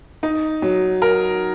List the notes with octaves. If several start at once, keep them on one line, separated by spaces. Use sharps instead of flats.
D#4
F#3
A#4